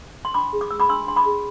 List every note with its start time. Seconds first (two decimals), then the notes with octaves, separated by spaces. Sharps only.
0.25 C6
0.34 D4 B5 D6
0.53 G#4
0.61 D6
0.70 B4 E6
0.80 B5 D6
0.89 D4 C6 E6
1.07 D4 C6
1.16 B5 D6
1.26 G#4